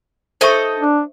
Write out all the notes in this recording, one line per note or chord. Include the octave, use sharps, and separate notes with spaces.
D#4 A4 C5 D#5 E5 C#6
D4